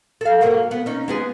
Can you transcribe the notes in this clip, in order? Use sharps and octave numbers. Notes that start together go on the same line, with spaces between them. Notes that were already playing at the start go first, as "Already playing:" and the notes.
A4 F5
G#2 F#3 A#3
B3
C#4 D#4
G#3 B3 G#4